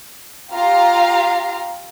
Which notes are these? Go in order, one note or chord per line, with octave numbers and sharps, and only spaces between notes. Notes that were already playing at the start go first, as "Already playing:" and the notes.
F4 G4 F5 A#5